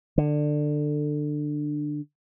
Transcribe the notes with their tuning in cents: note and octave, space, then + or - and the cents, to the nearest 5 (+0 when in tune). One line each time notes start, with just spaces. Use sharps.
D3 +20